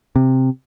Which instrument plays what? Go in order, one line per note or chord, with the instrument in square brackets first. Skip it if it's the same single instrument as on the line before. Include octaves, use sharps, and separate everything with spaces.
[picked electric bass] C3